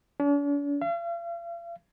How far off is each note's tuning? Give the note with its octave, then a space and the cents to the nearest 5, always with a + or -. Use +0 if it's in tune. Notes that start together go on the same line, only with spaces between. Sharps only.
D4 -45
F5 -40